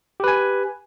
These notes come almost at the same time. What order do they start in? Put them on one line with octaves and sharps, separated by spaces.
G4 B4 G#5